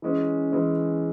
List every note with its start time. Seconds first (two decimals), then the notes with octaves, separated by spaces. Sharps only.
0.02 E3 G#3 C#4
0.52 E3 G#3 C#4